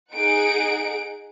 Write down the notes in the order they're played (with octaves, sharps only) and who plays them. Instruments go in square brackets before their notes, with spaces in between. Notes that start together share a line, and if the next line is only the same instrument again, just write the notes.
[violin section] D#4 G#4 F#5 D7